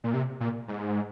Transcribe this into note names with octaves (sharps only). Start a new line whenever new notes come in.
A#2
C3
A#2
G#2